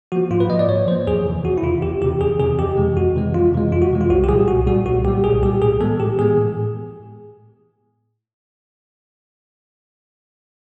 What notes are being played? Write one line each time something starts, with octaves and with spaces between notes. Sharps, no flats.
F3 A#3 F#4
G#2 F4
B4
F3 A#3 D#5
D5
G#2 C#5
F3 A#3 C5
E2 G#4
C3 E3
E2 F#4
E4
C3 E3 F4
E2 G4
C3 E3 G4
E2 G#4
C3 E3 G#4
F2 G4
C3 E3 G#3
F2 F#4
C3 E3 G#3
F2 F4
C3 E3 G#3
F2 F4
F#4
C3 E3 G#3
F4
C2 F#4
G4
A#2 G3 G#4
C2 F#4
A#2 G3 F#4
C2 F#4
A#2 G3 G4
C2 G#4
A#2 G3 G4
A2 G#4
E3 G#3 B3 A4
A2 G4
E3 G#3 B3 G#4
A2